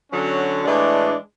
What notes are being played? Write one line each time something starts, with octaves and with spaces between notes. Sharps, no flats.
D3 F#3 C#4
A2 E3 G#3 D4